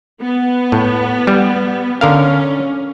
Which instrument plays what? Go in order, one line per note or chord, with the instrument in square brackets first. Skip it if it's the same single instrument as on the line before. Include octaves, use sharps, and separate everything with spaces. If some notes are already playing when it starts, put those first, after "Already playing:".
[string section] B3
[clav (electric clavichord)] A2
G3
[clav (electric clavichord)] D3 A#4 F5 [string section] C#4